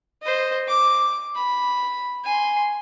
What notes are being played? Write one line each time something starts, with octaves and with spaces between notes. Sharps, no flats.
C5 D#5
D6
B5
G#5 C6